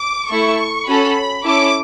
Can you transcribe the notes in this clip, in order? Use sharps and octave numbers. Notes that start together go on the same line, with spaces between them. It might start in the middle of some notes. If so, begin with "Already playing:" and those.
Already playing: D6
A3 E4 A4 C#6
C#4 F#4 A4 B5
C#4 E4 A4 D6